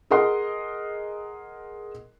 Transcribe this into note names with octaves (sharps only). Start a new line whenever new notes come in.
G#4 A#4 D#5 F#5 C6